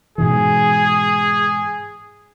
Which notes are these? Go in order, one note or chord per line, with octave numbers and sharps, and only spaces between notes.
G#2 B2 E3 G#4